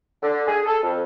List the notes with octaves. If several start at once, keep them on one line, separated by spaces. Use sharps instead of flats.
D3
G#4
A4
F2